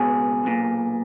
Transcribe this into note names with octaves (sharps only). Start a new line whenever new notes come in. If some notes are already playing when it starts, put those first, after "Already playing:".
Already playing: C#2 B2 G#4
B1 A#2